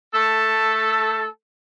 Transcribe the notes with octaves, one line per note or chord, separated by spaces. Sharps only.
A3 A4